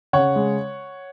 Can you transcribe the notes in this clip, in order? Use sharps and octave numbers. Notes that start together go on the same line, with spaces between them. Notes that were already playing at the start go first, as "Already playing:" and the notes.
C#3 C#5 F#5
G#3